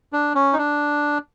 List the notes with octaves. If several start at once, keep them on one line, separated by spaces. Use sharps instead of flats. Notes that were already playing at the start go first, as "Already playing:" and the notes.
D4
C#4
D#4
D4